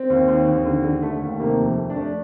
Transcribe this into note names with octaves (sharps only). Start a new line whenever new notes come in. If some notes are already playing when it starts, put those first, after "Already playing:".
Already playing: C4
D#2
D#2
D#2
D3
D3
A3
D#2
C3 A#3
F2
A3
D4
A3